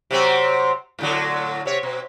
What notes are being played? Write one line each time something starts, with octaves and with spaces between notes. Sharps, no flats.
C3 F#3 C4
A2 D3 F#3
C3 C#5
B2